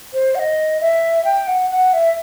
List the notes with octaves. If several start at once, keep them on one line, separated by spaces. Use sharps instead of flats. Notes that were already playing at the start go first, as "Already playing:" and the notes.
C5
F#5
D#5
E5
G5
F#5
F#5
E5